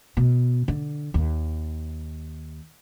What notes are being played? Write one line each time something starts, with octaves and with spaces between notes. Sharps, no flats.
B2
D3
D#2